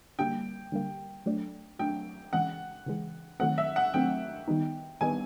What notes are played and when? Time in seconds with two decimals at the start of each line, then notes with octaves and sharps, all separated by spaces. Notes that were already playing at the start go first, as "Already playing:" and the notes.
0.19 D3 G3 A#3 G5
0.72 D3 G3 A#3
1.26 F#3 A3 D4
1.79 F#3 A3 D4 G5
2.33 C#3 E3 G#3 F#5
2.86 C#3 E3 G#3
3.40 D#3 F#3 A3 C4 F#5
3.58 E5
3.76 F#5
3.94 D#3 F#3 A3 C4 G5
4.48 D#3 G3 B3 D#4
5.01 D#3 G3 B3 D#4 G#5